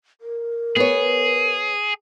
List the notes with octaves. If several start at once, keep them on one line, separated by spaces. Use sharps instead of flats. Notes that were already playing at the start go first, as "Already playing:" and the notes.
A#4
B3 G#4 C#5